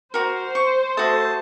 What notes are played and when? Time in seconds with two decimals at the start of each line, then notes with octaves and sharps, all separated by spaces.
0.14 F#4 A#4 C5
0.55 C#6
0.97 A3 F#4 A5 D#6